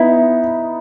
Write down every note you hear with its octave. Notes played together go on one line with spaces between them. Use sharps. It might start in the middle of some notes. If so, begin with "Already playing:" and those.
Already playing: B3 D#4 E4